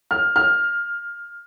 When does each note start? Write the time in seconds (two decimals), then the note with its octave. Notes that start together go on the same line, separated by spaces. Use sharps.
0.11 F6
0.36 F6